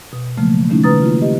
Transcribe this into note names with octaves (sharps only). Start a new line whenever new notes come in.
B2
C#3 F3 F#3 A3 A#3
D#3 G3 A3 C#4 D#4 E4
C#3 B4 A#5 D#6 A6
A#3 E4 F4
G4 D#5